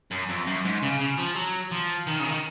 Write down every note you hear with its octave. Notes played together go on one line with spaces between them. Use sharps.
F#2
F2
F#2
G#2
C#3
C#3
F3
F#3
F3
D#3
C#3
D#3